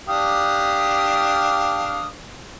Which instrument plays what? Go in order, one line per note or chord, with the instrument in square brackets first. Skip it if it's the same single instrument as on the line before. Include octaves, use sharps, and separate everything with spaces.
[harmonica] D4 G4 F5 [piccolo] D#6